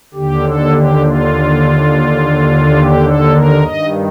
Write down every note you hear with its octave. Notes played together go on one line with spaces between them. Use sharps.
D#2 D3 G4
A4
G4
F4
G4
A4
A#4
G2 D#3 D#5